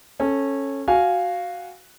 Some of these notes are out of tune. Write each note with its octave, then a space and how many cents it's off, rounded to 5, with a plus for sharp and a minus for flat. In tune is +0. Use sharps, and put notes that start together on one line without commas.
C#4 -15 A4 +0
F#4 +0 F5 +0 G#5 +0